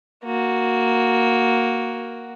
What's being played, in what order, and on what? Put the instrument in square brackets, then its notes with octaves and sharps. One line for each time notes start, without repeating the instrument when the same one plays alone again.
[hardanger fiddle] A#3 F#4